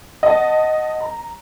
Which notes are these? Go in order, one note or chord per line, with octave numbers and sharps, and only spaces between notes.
D#5 F#5 A5
A#5